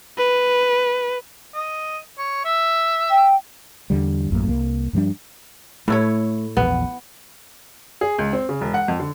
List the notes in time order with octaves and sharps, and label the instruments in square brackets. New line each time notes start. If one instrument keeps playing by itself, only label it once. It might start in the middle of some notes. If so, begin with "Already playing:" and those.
[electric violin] B4
[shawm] D#5
C#5
E5
[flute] G5
[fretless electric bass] E2 D3 G3
A1 F#2 A2 A#3
C2 A#3
G2 F3 G3 D4
[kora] A2 E4 C#5 [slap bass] A3
[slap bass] A#1 E2 [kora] B3
[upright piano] G#4
C#2
C4
C#3
E1
F#5
F2
D3